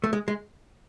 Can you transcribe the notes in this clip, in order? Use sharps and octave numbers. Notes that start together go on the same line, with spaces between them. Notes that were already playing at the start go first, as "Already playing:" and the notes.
A3
G#3
G#3